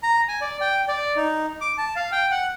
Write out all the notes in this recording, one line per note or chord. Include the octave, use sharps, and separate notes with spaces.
A#5
G#5
D5
G5
D5
D#4
D6
A5
F5
G5
F#5